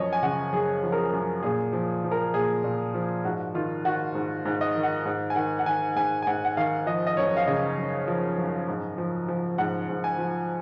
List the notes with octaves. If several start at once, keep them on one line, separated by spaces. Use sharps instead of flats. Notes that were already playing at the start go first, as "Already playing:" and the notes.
Already playing: F#2 F3 C#5 D#5
G#5
C#3 F#5
F#2 G#4
F3
A#4
G#4
F#2
A#2 G#4
F3
F3
A#4
A#2 G#4
A#2
F3
G#2 F#4
D#3 F4
D#3 F#4
G#2
G#2
D#5
D#3
F#5
G#2
G#5
D#3 F#5
F#5
D#3 G#5
G#2 G#5
G#5
G#2 F#5
F#5
D#3 F5
F3 D#5
D#5
F#2 C#5
F5
C#3 D#5
F#2
F3
F#2
G#2
F3
F3
G#2 F#5
G#2
G#5
F3